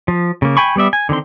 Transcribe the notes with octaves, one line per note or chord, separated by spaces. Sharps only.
F3
C#3 A#3
G5 G#5 B5 C#6
G3 B3 D5 E5
G#5
D3 D#3 C4 C6